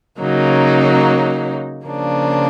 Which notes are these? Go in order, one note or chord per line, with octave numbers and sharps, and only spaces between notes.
C#3 F#3 A#3 D#4
C#3 F3 A#3 D4